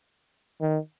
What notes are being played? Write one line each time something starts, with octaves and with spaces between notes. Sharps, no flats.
D#3